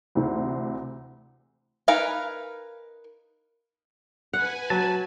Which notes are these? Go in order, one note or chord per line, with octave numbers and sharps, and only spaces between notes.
D2 C3 E3 C5
D#4 A#4 B4 F5 G#5
B4 F#5 G#5
F#3 A5